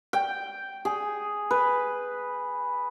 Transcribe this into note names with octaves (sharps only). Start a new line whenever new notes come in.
G5
G#4
B4